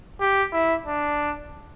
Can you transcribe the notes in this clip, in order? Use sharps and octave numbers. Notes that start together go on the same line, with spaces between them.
G4
E4
D4